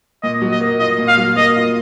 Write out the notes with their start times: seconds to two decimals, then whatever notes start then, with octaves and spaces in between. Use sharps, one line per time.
0.23 A#2 D#5
0.42 F#3
0.51 D#5
0.61 A#3
0.79 F4 D#5
0.99 A#2
1.08 F5
1.17 F#3
1.36 A#3 D#5
1.56 F4